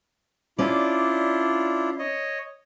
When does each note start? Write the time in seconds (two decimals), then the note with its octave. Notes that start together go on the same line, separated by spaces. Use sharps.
0.58 C#4 D4 E4 F4 D5
1.99 C#5 D#5